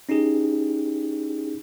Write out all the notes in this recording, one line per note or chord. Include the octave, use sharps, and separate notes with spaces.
C#4 D#4 E4 G4 G#4